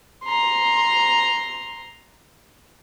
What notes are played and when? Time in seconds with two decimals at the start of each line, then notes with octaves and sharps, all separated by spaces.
0.24 A#5 C6